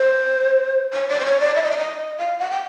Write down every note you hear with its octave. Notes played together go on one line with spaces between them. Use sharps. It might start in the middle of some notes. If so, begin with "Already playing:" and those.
Already playing: C5
C#5
D5
C5
C#5
D5
E5
D#5
D5
D#5
F5
F#5
G5